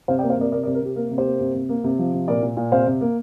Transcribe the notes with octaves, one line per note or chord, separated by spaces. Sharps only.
C3 C5 F5
D5 G5
A#3
C5 F5
C3 A#4 D5
C3 A#4 D5
A#4 D5
C3
A#4
C3 G4
A#3 A#4
C3
G4 C5
A#3
C3
C3
A#3
C3
F3
C3
A#2 A#4 D5
A#2
A#2
C3 C5 F5
C3
A#3